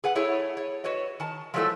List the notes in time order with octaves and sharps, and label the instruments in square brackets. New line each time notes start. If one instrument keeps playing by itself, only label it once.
[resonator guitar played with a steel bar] G#4 B4 F#5
A3 E4 G#4 C#5
C#5
F#4 B4 C#5 D#5
D#3 A5
F3 F#3 G#3 A3 E4 A4